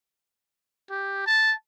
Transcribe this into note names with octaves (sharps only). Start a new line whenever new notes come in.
G4
A5